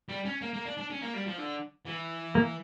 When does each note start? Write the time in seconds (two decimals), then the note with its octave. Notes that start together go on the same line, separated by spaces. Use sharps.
0.09 G3
0.25 C#4
0.41 A#3
0.53 A#3
0.65 D4
0.77 D4
0.90 C#4
1.02 A#3
1.14 G3
1.26 F3
1.38 D3
1.87 E3
2.35 A#3